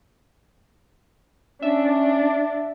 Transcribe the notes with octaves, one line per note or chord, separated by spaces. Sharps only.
C#4 D4 E5